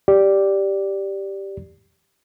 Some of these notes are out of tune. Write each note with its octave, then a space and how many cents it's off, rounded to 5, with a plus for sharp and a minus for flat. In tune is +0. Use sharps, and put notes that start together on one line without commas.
G4 +0 D5 -5